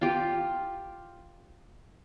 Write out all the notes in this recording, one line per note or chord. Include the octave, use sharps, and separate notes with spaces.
F4 G4